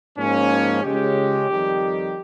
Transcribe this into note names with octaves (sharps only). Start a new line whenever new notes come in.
G#2 F3 A#3 C#4
C#2 C#3 G#3 C#4 G4
F2 D#3 G3